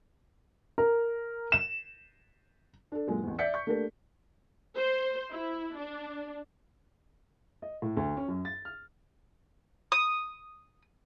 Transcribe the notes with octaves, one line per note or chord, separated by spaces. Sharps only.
A#4
E7
D4 A4
F#2 A#2 G#3 A#3
A1 E2
D5 E5 G6 B6 C#7
C#6 G6
A3 A#3 D4 G4 A4 A#4
C5
E4
D4
D#5
A2
D2
C#4
F#2
A6
F6
D#6